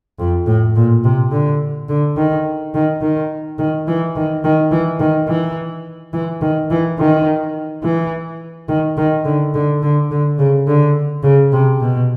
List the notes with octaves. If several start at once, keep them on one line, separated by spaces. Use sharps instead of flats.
F2
A2
A#2
C3
D3
D3
D#3
D#3
D#3
D#3
E3
D#3
D#3
E3
D#3
E3
E3
D#3
E3
D#3
E3
D#3
D#3
D3
D3
D3
D3
C#3
D3
C#3
C3
B2